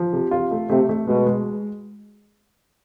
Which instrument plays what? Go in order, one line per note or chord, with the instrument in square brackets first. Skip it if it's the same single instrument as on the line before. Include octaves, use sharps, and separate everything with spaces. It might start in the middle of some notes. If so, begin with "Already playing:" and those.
Already playing: [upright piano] F3
C3
F4
A3
[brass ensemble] C3 [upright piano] A3
[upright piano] A3
[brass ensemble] B2 [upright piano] G#3
[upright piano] G#3